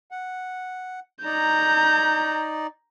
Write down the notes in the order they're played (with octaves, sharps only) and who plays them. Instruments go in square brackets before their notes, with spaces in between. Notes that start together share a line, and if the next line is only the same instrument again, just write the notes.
[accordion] F#5
[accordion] D#4 D5 [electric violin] A#5 G6